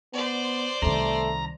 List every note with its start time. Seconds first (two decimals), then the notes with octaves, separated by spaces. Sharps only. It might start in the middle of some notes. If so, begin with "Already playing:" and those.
0.13 B3 C5 D5
0.82 C2 D#3 A3 A#5